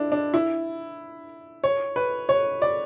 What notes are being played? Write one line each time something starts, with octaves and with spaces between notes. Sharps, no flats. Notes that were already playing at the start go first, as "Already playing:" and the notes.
Already playing: D4 E4
D4
E4
C#5
B4
C#5
D5